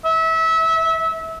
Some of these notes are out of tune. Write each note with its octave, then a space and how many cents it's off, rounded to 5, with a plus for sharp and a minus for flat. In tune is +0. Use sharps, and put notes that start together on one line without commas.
E5 -25